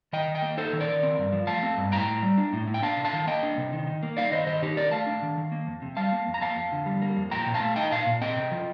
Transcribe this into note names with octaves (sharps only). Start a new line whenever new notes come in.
D#3 D#5 G5
D#3
D#5 G5
A#3
D#4 A4 C5
D#3
A#4 D5
D#3
C4
G2
F3
A3 F5 A5
C4
G2
A2 G5 A#5
A2
G3
D4
A2
A2
G5
D4 F5 A5
C3
F5 A5
D#3
A#3 D#5 G5
D4
C3
D#3
D#3
A#3
D#4 D5 F5
D#3 C5 D#5
D#3 C5 D#5
D#3 D#4 G4
D#3 A#4 D5
A3 F5 A5
D4
D#3
D#3
A#3
F2
C3
G3 F5 A5
A#3
F2
A#5
A#3 F5 A5
F2
D3
G3
A#3
F2
A#2 G5 A#5
A#2
F5 A5
A3
D#4 D#5 G5
A#2 F5 A5
A#2
C4 D#5 G5
C3
F3